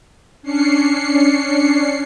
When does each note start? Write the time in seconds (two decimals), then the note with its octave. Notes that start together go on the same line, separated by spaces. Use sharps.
0.42 C#4 D4 C7 C#7